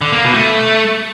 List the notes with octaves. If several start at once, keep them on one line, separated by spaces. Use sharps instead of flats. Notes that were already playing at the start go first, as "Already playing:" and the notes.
D3
A#3
B2
A3